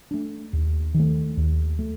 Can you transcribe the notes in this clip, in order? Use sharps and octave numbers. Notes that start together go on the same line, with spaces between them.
A3 D4
D#2
D#3 A3
D#2
A3